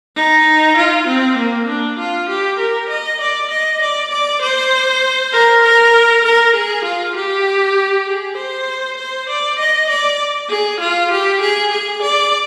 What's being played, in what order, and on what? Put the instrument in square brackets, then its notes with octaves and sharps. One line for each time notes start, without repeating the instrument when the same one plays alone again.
[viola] D#4
F4
C4
A#3
D4
F4
G4
A#4
D#5
D5
D#5
D5
D5
C5
A#4
A#4
A#4
G#4
F4
G4
G#4
C5
C5
D5
D#5
D5
G#4
F4
G4
G#4
G#4
D5